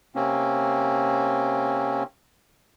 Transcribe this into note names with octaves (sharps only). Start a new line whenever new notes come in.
C3 A#3 C4 C#4